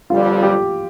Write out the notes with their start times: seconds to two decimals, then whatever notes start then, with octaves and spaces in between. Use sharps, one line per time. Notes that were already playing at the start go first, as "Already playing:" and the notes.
0.10 G1 F2 D3 G3 F4
0.43 G4